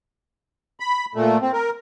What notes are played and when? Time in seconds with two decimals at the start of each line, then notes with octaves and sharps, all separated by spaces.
0.80 B5
1.15 A#2 A3
1.42 C4
1.53 A#4